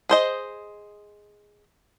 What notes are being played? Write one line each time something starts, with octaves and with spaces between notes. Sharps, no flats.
G#4 C5 D#5